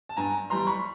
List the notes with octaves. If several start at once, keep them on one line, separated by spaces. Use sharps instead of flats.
A5
G2 G#5 A#5
E3 G3 A#5 C6
B5 C#6